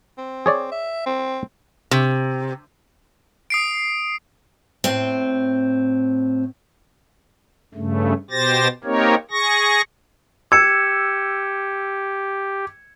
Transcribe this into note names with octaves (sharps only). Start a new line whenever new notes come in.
C4
G#4 C#5 D5
E5
C4
C3
D#6 C7 D7
A2 C4
G2 C#3 A3
B2 G4 C5 A6 A#6
A#3 C4 D#4 G4 A#4 C#5
G#4 C#6 A#6
G4 E6 G#6 C#7 E7